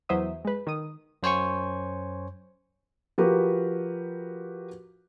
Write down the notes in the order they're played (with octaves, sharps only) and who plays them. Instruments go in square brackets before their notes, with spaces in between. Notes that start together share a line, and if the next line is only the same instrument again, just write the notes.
[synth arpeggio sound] E2 F#3 C5 E5 D#6
G#3 B4
D#3 D#6
[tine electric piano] F#2 C5 C#5 G#5 C#6
[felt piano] F3 F#4 G4 A#4 B4